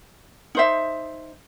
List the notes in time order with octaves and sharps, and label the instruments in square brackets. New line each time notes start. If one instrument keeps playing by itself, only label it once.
[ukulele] D#4 C5 E5